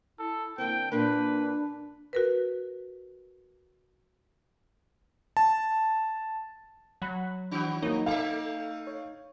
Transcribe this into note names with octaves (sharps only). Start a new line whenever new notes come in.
E4 A4
D3 A#3 C4 G5
A#2 A#3 D4 B4
F#4 A#4 B4
A5
F#3 F#5 B5 F#6
D#3 D4 F#4
F#3 A#3 D#4 C#5
A3 A4 E5 F5
C#5